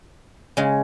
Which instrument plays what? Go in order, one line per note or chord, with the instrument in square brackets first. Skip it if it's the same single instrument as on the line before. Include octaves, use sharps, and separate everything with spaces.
[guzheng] C#3 G#3